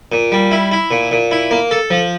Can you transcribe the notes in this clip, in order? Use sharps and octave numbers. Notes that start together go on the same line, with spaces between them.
A#2
G3
E4
E4
A#2
A#2
E4
A#3
A4
F3